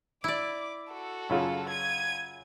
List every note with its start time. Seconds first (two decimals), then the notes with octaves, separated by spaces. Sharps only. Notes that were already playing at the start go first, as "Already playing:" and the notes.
0.24 E4 D5 D6
0.92 F#4 A4
1.29 F#2 C#3 F4
1.69 G#6 D#7